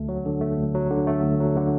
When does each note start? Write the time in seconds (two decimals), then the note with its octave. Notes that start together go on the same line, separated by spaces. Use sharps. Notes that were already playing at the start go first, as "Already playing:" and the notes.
Already playing: D2 A3
0.09 F#3
0.26 D3
0.41 A3
0.57 D2
0.75 F#3
0.90 D3
1.07 A3
1.23 D2
1.40 F#3
1.56 D3